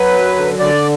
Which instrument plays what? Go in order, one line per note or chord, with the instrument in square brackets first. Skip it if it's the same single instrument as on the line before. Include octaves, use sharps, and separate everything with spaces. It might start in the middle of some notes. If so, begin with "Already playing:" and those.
Already playing: [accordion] F#3 B4
F#2
D3
D3 D5